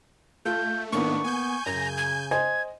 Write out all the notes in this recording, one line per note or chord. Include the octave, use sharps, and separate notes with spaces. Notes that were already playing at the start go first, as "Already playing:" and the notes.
A3 F4 A4 G6
A2 D#3 A#3 B3 D4 C#6
B3 G#5 G6
F#2 C#3 A#6
G#6
C5 D#5 G#5 G#6